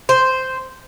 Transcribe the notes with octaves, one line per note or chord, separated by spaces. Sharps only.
C5